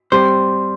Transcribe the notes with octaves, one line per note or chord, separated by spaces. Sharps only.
G3 C4 G4 C5